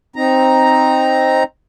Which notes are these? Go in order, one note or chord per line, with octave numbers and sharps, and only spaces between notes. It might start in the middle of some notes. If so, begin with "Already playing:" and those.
C4 D#4 A#5